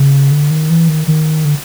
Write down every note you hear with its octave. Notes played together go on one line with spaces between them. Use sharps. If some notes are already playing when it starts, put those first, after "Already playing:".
Already playing: C#3
D3
D#3
E3
D#3
D#3
D3